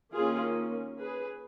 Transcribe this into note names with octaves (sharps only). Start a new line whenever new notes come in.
D#3 A#3 C#4 F4 G#4
G#4 B4